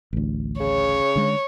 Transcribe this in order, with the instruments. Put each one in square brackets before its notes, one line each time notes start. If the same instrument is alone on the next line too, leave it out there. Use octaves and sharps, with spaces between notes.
[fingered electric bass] A1 D2
[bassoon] C#3 [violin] C#5
[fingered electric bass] D3 G#3